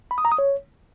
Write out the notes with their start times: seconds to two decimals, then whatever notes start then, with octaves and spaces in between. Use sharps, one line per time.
0.11 B5
0.18 D#6
0.25 A#5
0.32 D#6
0.38 C#5